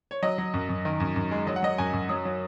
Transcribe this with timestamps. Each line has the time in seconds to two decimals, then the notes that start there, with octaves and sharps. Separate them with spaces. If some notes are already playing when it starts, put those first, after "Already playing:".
0.11 C#5
0.22 F#3 D#5
0.38 F#3
0.54 F#2
0.69 F#2
0.85 D#3
1.00 F#2
1.16 F#2
1.31 G#3
1.47 F#3 D#5
1.56 F#5
1.63 F#3 D#5
1.78 F#2 G#5
1.93 F#2
2.09 F#3 D#6
2.25 F#3